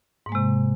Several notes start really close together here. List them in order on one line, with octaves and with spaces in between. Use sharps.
G#2 A#3 G#3 C3